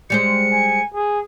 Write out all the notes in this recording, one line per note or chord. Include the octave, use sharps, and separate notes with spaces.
G3 G#3 C5 C#7
G#5
G#4